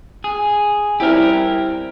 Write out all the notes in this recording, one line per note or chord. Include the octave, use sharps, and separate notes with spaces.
G#4
G3 C4 E4 G4 A#4